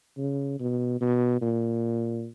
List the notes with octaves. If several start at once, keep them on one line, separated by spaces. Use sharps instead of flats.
C#3
B2
B2
A#2